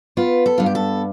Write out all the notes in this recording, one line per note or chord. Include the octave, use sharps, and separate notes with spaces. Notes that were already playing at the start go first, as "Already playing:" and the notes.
B3 F4
A4
G2 F4
G4
A4